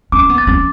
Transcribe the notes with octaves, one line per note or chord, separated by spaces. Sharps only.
C#4 D6
B3
A6
C#4